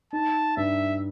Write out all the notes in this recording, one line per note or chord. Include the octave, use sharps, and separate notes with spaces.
D#4 A5
G2 E5